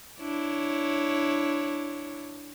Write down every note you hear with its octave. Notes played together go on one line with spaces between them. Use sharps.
D4 E4 C#5